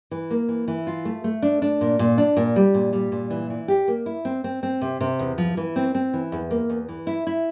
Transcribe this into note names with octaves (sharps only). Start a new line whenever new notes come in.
E3
A#3
E3
E3
F4
A3
A3
D4
D4
A#2
A#2
D4
A#2
G3
A#2
G3
A#2
E3
E3
G4
A#3
E4
C4
C4
C4
C3
C3
E2
F3
E3
C4
C4
E3
E2
A#3
E2
E3
E4
E4